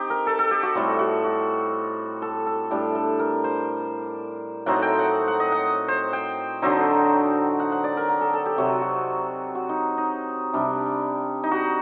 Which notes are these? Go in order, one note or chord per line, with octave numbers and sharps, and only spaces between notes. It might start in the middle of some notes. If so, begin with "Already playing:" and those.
Already playing: C4 D#4 G4
A#4
A4
A4
G4
F#4
A2 G3 C4 F#4
F#4
F#4
A4
A4
A2 G3 D4 G4
A4
A#4
C5
A2 F#3 C4 D#4 F#5
G5
F#5
F#5
D#5
F#5
C5
G5
D3 F#3 C4 D#4
F#5
F#5
D5
A#4
A#4
A4
A4
G4
C3 F#3 C4 F#4
F#4
F#4
D#4
D#4
C3 G3 D4
D#4
F#4